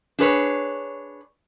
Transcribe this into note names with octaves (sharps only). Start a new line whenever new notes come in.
D4 G#4 B4 C#5